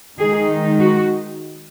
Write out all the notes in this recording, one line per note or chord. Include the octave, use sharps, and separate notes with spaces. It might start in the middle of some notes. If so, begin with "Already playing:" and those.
D#3 G#3 D#4 G#4
F#4